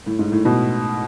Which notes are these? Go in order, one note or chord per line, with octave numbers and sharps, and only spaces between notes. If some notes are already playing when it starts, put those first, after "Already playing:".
A2
G#2
A2
B2